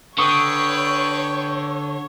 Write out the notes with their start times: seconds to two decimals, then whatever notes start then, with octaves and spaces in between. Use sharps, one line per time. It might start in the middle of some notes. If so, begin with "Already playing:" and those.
0.19 D3 B4 C#5 G5 C#6 D#6